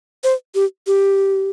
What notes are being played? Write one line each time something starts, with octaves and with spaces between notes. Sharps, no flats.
C5
G4
G4